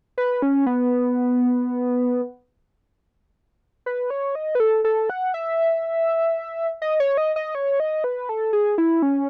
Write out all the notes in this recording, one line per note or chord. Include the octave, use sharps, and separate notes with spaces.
B4
C#4
B3
B4
C#5
D#5
B4
A4
A4
F#5
E5
D#5
C#5
D#5
D#5
C#5
D#5
B4
A4
G#4
E4
C#4